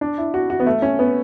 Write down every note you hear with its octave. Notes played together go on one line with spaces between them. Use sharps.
D4
E4
F#4
F#4
B3
A3
C#4
B3